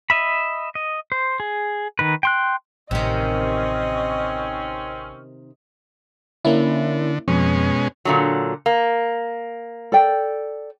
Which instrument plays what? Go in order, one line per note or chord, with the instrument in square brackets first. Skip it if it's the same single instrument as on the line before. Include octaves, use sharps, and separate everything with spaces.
[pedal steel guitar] D#5 E5 B5
D#5
C5
G#4
D#3 D#4 B4
G5 C6 F#6
[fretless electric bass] A1 [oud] C3 D#3 [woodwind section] C4 C#4 [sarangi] D#5
[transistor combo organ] D3 [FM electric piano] A#3 C#4 E4
[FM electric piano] F2 [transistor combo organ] B2 G#3 C#4
[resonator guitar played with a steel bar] A#2 D3 F#3
A#3
[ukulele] A4 D5 G5